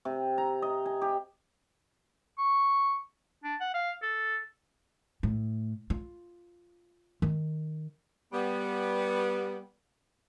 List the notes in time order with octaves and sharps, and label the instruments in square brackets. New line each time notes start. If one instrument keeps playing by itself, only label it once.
[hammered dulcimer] C3
A#5
D#5
G#5
G4
[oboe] C#6
[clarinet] D4
F#5
F5
A4
[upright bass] A2
F4
D#3
[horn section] G3 B3